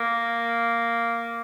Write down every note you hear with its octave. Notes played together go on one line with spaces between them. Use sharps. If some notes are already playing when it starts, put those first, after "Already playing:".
Already playing: A#3